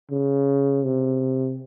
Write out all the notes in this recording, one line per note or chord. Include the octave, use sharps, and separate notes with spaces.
C#3
C3